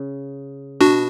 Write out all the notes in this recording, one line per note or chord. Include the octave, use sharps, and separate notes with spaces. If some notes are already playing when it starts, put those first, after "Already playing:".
Already playing: C#3
B2 D4 F#4